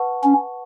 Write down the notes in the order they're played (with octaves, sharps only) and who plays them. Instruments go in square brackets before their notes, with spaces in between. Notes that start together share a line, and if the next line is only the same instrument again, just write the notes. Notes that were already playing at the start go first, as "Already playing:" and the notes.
Already playing: [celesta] B4 F#5 A5 C#6
[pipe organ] C#4